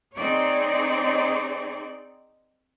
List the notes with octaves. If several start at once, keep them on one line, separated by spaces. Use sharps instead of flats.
C4 D#4 G#4 C#5 D5